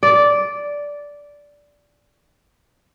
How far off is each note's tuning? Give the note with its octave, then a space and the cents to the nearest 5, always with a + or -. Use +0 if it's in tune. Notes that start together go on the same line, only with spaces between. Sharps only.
D5 -10